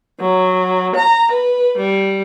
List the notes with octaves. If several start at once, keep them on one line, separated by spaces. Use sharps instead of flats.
F#3
A#5
B4
G3